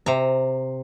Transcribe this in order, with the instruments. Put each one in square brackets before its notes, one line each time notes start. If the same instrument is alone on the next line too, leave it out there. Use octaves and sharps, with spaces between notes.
[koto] C3 A#5